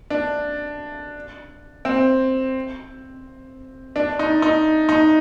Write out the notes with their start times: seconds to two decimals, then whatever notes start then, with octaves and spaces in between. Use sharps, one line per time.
0.10 D4
1.85 C4
3.96 D4
4.19 D#4
4.42 D#4
4.89 D#4